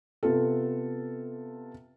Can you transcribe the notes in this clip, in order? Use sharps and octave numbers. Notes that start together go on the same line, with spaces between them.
C3 B3 F4 A4